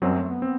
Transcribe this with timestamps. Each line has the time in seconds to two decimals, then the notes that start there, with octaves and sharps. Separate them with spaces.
0.02 F#2 F#3 G3 C4
0.16 A3
0.29 B3
0.42 B3 C4